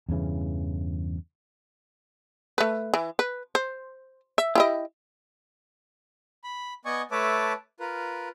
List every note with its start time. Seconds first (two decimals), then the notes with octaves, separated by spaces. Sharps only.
0.09 E2 G2 C#3 E3
2.58 A3 B4
2.94 E3
3.19 B4
3.55 C5
4.38 E5
4.55 E4 G4 D#5
6.44 B5
6.85 B3 D5 D#5 G#5 C#6
7.11 A3 B4 C#5 E5 A5 D6
7.80 F4 A#4 B4